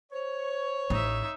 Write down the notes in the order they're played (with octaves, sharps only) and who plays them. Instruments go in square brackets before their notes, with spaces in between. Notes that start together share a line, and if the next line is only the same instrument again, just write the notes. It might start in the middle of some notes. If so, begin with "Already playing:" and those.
[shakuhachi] C5 [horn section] C#5
[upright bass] A1 [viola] D#4 E5